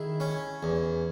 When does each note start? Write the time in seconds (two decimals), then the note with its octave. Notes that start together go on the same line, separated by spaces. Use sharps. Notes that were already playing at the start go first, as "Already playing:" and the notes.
Already playing: D#3 E4 G#4
0.20 C#4
0.63 E2